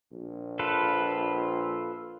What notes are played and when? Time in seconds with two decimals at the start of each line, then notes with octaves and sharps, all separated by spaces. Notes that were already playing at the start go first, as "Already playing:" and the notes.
0.12 A#1
0.59 F4 A4 B4